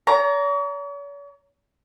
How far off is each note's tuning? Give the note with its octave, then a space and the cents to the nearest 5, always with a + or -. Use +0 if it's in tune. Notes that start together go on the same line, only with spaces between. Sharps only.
C#5 +45 A#5 +0